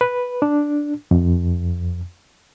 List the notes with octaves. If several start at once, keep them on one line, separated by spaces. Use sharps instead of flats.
B4
D4
F2